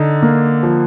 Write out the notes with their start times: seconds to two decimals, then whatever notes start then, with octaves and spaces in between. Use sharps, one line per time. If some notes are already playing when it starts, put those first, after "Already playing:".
Already playing: D3 D#4
0.22 A#3
0.63 F3